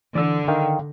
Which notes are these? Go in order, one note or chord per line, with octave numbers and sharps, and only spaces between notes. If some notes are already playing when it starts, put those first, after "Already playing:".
D3 E3 D5 E6
D#3 F5 G5